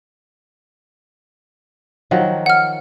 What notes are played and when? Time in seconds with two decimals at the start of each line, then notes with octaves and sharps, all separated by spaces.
2.11 D#3 F3 F#3
2.46 F#5 F6